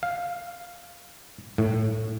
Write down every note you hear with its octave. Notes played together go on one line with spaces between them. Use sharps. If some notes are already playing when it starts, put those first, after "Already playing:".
F5
A2